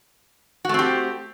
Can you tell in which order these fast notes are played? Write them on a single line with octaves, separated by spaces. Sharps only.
F#4 A3 C4 G4